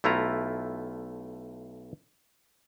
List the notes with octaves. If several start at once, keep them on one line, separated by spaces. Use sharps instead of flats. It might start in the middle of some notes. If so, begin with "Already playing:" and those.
B1 A3 E4 F4 A#5